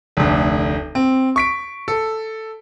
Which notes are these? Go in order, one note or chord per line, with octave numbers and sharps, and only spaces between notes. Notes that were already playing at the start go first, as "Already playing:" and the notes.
F1 D2
C4
C#6 B6 D7
A4